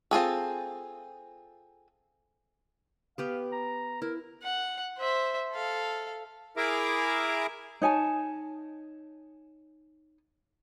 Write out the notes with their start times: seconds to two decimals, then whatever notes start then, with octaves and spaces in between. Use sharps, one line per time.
0.11 C4 F4 G#4 A4
3.18 B3 G4 B4 F5
3.52 A#5
4.02 E4 A#4
4.42 F#5
4.98 C5 E5
5.52 A4 F5
6.57 E4 G#4 A#4 E5 A#5 D6
7.82 D#4 C#5 G#5 A5